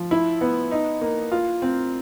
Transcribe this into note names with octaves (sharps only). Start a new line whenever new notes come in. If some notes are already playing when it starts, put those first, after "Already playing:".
Already playing: F3
E4
B3
D#4
A#3
F4
C4